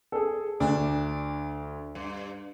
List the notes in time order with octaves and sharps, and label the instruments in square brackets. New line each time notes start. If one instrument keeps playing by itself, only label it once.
[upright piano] G#4 A4
[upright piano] D2 [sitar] D4
[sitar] G2